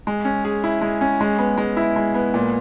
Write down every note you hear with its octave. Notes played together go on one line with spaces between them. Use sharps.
G#3
C#4
G#4
E4
G#3
C#4
G#3
B3
G#3
E4
G#3
B3
A#2